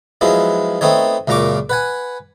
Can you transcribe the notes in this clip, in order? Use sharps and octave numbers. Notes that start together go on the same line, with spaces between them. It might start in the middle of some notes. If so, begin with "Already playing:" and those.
F3 F#3 G#3 B3 E4
A3 B3 C4 D#4 C#5
C#2 F#2 A#2 A#5 C#6 D6
B4 F#5 G#5